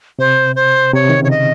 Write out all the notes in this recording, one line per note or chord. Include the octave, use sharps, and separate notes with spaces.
C3 C5
C5
C3 C#5
D#3
C#3
C#5
D#5